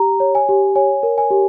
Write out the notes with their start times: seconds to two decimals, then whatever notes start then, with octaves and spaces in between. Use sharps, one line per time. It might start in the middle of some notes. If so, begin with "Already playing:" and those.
Already playing: G4 A#5
0.20 C#5
0.35 G#5
0.49 G4
0.75 C#5 G#5
1.03 A#4
1.18 G#5
1.31 G4